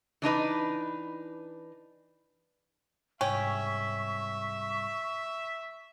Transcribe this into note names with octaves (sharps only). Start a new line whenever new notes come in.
E3 D4 D#4 B4
C2 G#2 C#4 E5 G5 C#6